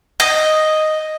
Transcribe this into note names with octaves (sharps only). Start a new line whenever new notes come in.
D#5